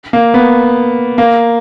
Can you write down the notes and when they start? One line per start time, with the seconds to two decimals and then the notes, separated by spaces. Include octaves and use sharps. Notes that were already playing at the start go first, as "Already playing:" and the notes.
0.13 A#3
0.34 B3
1.18 A#3